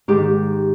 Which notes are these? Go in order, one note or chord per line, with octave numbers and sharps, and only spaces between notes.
G#2 D#3 G4